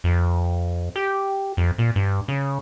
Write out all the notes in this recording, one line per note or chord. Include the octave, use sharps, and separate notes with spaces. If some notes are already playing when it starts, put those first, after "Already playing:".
F2
G4
F2
A#2
G2
C#3